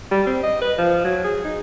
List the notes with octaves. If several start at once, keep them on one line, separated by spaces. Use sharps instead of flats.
G3
C4
D#5
B4
F3
F#3
G#4
D#4